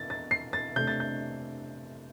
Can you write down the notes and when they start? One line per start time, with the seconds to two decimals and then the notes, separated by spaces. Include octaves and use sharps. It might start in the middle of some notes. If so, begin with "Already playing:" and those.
Already playing: A6
0.10 A6
0.31 C7
0.53 A6
0.76 C3 A3 D4 G6
0.87 A6
1.00 G6